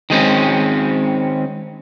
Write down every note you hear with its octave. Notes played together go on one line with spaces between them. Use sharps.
D#3 G#3 C4 C#4